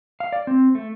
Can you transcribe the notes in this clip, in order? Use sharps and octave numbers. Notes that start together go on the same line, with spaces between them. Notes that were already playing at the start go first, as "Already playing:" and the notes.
F5
D5
C4
A3